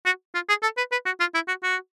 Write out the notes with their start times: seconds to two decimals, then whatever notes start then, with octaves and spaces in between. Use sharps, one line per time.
0.06 F#4
0.34 F4
0.49 G#4
0.63 A4
0.77 B4
0.92 B4
1.06 F#4
1.20 F4
1.34 E4
1.48 F#4
1.63 F#4